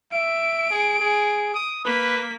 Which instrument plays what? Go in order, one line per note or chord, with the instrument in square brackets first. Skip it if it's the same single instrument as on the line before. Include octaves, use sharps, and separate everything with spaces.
[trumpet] E5 [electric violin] D7
[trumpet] G#4
G#4
D#6
[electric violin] A#3 B6 [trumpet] B4